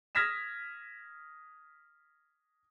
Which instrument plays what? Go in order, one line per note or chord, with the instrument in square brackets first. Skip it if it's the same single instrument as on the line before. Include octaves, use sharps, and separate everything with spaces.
[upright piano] D#6 F6 G#6 A#6 B6 E7